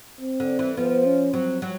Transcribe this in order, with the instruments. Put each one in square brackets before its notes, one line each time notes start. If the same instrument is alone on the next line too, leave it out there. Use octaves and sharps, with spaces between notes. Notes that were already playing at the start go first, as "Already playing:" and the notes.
[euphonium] C4
[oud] D3
E3
[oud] F3 [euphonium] B3
[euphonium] C#4
[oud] F#3 [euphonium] C4
[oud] F#3